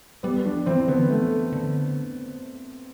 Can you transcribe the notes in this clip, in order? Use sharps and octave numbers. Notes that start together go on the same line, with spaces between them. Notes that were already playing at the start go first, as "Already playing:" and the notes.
G3 B3
F3 D4
E3 C4
D3 B3
F3
E3 A3
D3